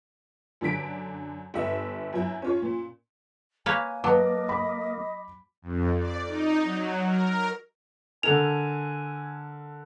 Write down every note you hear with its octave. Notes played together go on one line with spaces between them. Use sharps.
F#2 D3 A5 B6 D7
G1 E5
F#2 F#3 E4
C#4 F4 C#5
A#2
A#3 B4 C#5 G#5
F#3 A#3 B4 D#5 A5 D6
B5 D6
F2
D5
D#4
F#3
A#4
D3 A4 A#4 G#5 F7